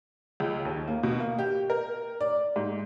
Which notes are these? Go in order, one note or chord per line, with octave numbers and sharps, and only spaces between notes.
C#2
D#2
A#3
B2
A#3
G4
A#4
D5
G#2